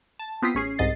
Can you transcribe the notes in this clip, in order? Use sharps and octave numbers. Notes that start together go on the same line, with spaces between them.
A5
B3 C4 F4 D#6 B6 C7
A1 C#4 G#4 C7
C2 G#2 D#5 A6 C7